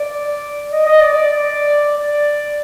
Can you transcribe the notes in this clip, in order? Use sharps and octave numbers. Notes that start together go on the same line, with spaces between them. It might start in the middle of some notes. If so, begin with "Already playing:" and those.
Already playing: D5
D#5
D#5
D5
D5
D5